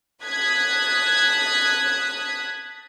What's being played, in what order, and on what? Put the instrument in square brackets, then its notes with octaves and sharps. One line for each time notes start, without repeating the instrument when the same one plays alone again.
[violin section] A5 D#6 F#6 G#6 B6